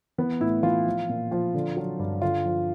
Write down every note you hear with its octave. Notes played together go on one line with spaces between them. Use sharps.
E3 B3
A2 E4
E3 F4
F3
A#2
F3
D3
F#3
G2
D3 F4
F3